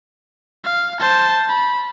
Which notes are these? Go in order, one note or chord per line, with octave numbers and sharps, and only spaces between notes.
F5
C5 A5
B5